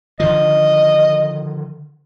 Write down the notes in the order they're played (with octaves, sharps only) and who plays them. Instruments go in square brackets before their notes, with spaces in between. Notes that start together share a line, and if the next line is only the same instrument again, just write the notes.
[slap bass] D3 D#3 F3 [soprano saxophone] D#5